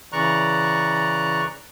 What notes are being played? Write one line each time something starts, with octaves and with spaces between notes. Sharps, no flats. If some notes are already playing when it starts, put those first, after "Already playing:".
C#3 E3 D5 A#5 C#6 F#6